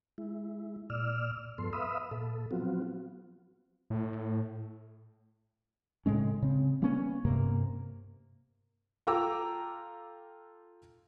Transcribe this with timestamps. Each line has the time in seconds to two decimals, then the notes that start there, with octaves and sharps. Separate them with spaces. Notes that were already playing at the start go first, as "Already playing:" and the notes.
0.18 G#3 E4
0.90 A#2 D5 E6 F6
1.58 G2 F3 B3 A4 C6
1.73 B4 E5 F5 B5 D#6 E6
2.11 A#2 A4
2.51 F3 F#3 B3 C4 F4 F#4
3.90 A2
6.06 A2 C#3 G#3 C#4
6.42 C#3 C4
6.82 G3 A#3 B3 C#4
7.25 G2 C3 A#3
9.07 F4 A4 G5 A#5 D6 E6